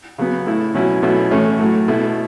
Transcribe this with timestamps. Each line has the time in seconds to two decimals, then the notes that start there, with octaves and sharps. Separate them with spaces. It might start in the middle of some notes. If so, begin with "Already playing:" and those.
0.18 C#3 F#3 B3
0.46 A2 A3 E4
0.74 B2 F#3 C#4 E4
1.03 B2 F#3 A3 C#4 E4
1.31 A2 E3 A3 C#4
1.59 A2 F#3 A3
1.88 B2 A3 E4